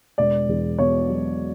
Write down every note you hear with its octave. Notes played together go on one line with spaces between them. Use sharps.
E1 D5
E2
B2 C#5
F#3